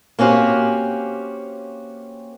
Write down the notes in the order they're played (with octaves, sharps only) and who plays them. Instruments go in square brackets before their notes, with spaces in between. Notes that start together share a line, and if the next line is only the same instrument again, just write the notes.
[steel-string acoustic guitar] A#3 C4 C#4 F#4 G4